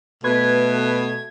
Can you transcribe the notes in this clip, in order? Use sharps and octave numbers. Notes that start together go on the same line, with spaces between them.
B2 A3 B4 G#6